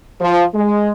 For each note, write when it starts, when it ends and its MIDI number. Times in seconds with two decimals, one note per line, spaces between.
0.21 0.43 53
0.54 0.91 56